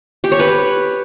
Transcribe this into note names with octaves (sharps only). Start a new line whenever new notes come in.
G4
C#5
B4